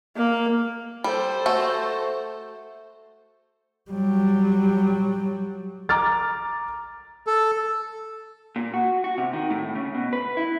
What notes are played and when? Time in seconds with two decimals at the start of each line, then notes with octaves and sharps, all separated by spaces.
0.17 A#3
1.04 G3 A4 C5
1.46 A3 F#4
3.91 F#3 G3
5.89 A#5 D6 F6 A6
7.27 A4
8.56 A#2
8.74 F#4
9.04 F#4
9.18 C3
9.33 D#3
9.50 A2
9.75 C#3
9.95 B2
10.13 B4
10.37 E4